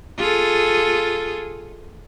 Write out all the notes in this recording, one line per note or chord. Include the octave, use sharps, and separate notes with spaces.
F4 G#4 A4